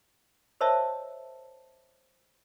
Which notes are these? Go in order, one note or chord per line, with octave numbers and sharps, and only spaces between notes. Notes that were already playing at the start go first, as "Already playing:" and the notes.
A#4 C5 C#5 D#5 E5 A5